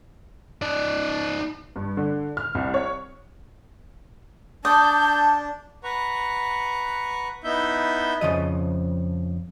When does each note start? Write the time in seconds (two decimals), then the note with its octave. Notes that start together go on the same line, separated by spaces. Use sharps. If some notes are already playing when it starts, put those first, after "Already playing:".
0.62 D#4 D5
1.76 G2
1.97 D3
2.37 F6
2.55 C2
2.74 C#5
4.65 D4 D5 A5 D#6 G6
5.84 B4 F#5 A#5 C#6
7.44 B3 D#4 E4 E5 G6
8.21 F2 C#3 F3 D#5